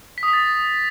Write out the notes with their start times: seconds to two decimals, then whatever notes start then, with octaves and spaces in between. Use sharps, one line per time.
0.18 B6
0.23 D#6
0.28 B6
0.33 A6